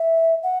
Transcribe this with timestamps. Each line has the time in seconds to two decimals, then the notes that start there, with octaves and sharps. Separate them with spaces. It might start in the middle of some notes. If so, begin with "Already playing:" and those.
Already playing: E5
0.43 F#5